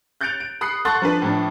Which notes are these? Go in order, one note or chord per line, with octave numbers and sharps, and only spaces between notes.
F#6 G6 A6 C#7 D7 F7
D7
B5 D#6 F#6 C7 C#7
A4 F#5 C6 C#6 F#6 A6
F3 D4 B4
A2 F3 D4